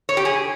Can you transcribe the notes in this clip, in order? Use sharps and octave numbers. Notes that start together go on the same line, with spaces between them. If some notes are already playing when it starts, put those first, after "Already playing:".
C#5
G4
G#4